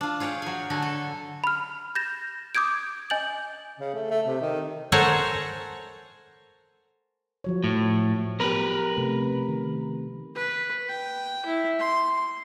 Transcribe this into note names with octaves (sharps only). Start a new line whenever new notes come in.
D4 F4
F4 G#4 C#5 F5 G5
F#3 G#5
D3 F#4 A4 G#5
A4
B5 F6
G6 A6 A#6 E7
D6 D#6 G6 G#6 D7
D#5 G#5 G6 A6 F#7
C#3
A3
A3
C3
D#3
A4 A#4 C5 C#5 F#5 G#5
F3 F#3 C#5
A2
B3 G4 A#4 B4
C3 A3
D#3
B4
G5
E4
C6